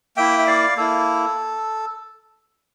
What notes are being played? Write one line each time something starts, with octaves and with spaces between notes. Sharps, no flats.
A#3 E4 E5 G5
E5
D5 F5
A#3 E4 A4